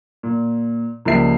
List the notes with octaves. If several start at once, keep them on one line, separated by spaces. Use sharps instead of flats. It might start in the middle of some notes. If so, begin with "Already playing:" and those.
A#2
C#2 F3 G3 A#3 E5 C7